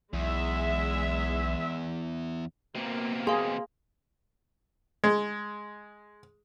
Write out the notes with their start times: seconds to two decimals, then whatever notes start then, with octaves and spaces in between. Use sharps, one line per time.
0.13 B1 E2 G#3 E5
2.75 B2 A#3 C4
3.27 G#4 F5 C6
5.04 G#3